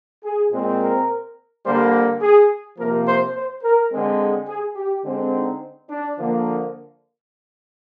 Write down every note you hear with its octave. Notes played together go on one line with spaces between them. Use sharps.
G#4
A#2 G#3 C4
A#4
D3 G3 A#3 C5
G#4
C3 F3 A#3 A#4
C5
C5
A#4
D3 G#3 C4
G#4
G#4
G4
D3 G#3 C4
D#4
D4
D3 F3 A#3